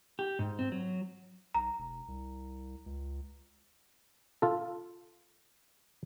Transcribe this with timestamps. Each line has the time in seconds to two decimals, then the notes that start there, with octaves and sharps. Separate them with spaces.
0.19 G4
0.39 G#2
0.59 C4
0.72 F#3
1.55 B1 A#5
1.79 E1
2.08 C2
2.86 C#2
4.42 F4 A4